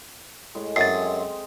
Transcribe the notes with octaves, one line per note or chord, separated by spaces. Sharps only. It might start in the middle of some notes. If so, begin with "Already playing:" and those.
A2 G#3
F#2 C4 D#5 G#5 A6 C7